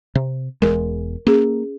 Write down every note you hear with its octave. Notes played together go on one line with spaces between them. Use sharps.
C3
E1 E2 G#3 A#4
A#3 C#4 G#4